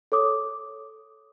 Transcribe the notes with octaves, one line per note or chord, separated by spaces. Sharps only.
A4 C#5 D6 D#6